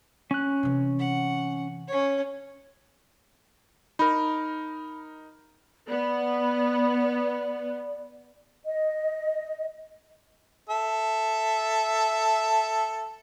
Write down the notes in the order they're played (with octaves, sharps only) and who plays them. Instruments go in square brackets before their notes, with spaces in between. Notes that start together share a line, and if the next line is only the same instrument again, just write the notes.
[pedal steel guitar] C#4 F#6
[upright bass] C3 E3
[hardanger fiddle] F#5
C#4 C#5
[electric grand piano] D#4 A#4 [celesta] B5
[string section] B3 [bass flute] D5
[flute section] D#5
[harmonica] A4 E5